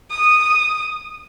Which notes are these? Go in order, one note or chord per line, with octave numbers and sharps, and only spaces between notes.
D#6